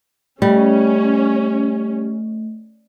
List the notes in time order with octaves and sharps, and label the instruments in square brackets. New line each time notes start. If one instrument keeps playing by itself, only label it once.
[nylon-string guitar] G3 [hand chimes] A3 [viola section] C#4